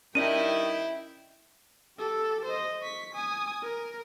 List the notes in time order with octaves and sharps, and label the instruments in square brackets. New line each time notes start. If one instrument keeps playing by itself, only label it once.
[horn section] G2 D#3 [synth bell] C#4 D5 D#5 [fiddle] E4 G5 [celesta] D#7
[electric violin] G4 A4
C5 D#5
C#6 B6
G#5 D#6
A#4